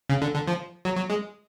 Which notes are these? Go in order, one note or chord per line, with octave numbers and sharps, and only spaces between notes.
C#3
D3
D3
F3
F#3
F#3
G#3